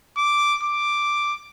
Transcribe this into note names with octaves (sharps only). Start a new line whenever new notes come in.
D6
D6